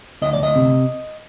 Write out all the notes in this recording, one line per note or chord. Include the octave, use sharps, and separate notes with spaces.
D2 D#5
D5
D2 D#5
C3